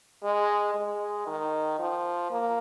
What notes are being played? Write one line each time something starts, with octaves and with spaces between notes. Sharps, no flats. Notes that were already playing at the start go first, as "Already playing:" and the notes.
G#3
G#3
D#3
F3
A#3